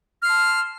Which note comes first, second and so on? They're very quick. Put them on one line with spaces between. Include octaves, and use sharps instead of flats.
F6 C6 A5